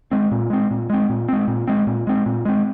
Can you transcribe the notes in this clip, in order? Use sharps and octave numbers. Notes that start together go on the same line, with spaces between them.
G#3 C4
A#2
G#3 C4
A#2
G#3 C4
A#2
G#3 C4
A#2
G#3 C4
A#2
G#3 C4
A#2
G#3 C4